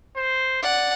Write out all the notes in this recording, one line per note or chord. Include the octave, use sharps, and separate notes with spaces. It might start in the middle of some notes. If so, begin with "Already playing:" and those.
C5
D5 F#5